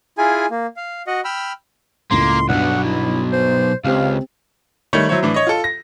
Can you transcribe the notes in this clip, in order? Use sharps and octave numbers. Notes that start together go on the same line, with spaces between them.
E4 F4 G#4 G#5
A#3
F5
F#4 D#5 F#5
G5 B5 E6 F6
C#2 A2 A#3 C6
B1 G2 B2 F#5
E4
C5
C#2 C4 G4 C5 F5
D#3 G3 A3 C#5
F#3 E4 C5 C#5
A2 E3 D4
C#5 D#5
F4 A4
A#6